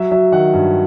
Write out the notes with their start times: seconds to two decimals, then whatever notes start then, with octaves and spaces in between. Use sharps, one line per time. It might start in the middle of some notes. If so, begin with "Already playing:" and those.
Already playing: F#3 E5
0.11 F#3 E5
0.32 D#3 F#5
0.53 G2